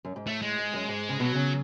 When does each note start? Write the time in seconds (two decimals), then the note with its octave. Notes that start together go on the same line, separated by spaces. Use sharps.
0.05 F#2
0.16 G#2
0.26 A2 A3
0.42 G#3
0.58 G#2
0.74 F#2
0.88 G#2
1.09 C#3
1.20 B2 F#3
1.35 C#3